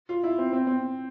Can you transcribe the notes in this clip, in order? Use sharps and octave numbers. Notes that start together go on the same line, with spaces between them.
F4
E4
C4
C4
C4